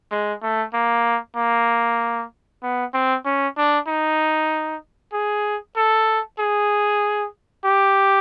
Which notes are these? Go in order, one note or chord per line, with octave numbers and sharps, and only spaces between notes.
G#3
A3
A#3
A#3
B3
C4
C#4
D4
D#4
G#4
A4
G#4
G4